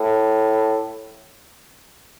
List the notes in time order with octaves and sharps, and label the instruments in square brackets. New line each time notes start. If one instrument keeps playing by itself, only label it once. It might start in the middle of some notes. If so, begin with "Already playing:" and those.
Already playing: [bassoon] A2